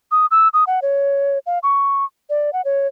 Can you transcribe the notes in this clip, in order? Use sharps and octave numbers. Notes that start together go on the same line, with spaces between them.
D#6
E6
D#6
F#5
C#5
F5
C#6
D5
F#5
C#5